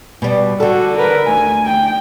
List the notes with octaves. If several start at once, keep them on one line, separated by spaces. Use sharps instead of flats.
B2 G3
D3 F#4 A4
A#4 B4
D2 G#5
G5